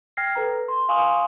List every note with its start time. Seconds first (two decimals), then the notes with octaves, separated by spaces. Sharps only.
0.17 G5 F6 G#6 A#6 C7
0.35 A4 B4 A#5
0.68 C6
0.89 F5 G#5 C6 C#6 D#6